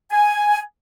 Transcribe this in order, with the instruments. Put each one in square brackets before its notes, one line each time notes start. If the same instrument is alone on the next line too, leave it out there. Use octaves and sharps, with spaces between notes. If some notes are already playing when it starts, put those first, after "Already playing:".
[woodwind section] G#5